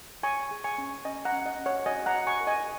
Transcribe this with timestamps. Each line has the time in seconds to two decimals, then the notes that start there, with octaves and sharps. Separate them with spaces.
0.23 C#5 G#5 C#6
0.51 G#4
0.64 G#5 C#6
0.78 C#4
1.05 C#4 D#5 G#5
1.25 F#5 A#5
1.32 C#4
1.46 D#5
1.59 C#4
1.66 C#5 F#5
1.86 F#4 D#5 G#5
2.06 F#5 A#5
2.14 F#4
2.27 G#5 C#6
2.41 A#4
2.47 D#5 G#5